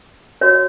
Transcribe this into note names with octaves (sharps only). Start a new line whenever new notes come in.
F#4 C#5